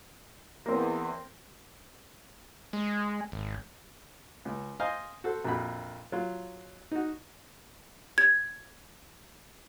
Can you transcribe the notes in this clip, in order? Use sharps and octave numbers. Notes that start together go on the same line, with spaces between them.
E2 A#3 C4
G#3
G#1
C#2
C5 D#5 F5 G#5 A#5
F#4 A4 C5
A#1 F2 F#4 B5
F#3 F4
D#4 F#4
G#6